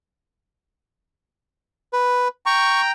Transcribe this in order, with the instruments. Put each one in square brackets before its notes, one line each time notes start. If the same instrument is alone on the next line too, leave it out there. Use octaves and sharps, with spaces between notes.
[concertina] B4
[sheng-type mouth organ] G5 A#5 [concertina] C#6